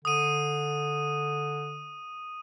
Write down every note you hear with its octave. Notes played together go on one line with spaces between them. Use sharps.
D3 D#6 D#7